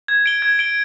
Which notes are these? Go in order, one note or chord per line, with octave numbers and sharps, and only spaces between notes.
G#6
D7 G7
G#6
D7 G7